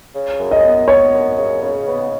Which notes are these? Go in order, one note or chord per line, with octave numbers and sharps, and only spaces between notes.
C#3
F#2
D#5
B3
B3 C#5
F#2
C#3
C#3
B3